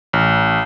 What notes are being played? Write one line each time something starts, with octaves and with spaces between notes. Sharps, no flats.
A1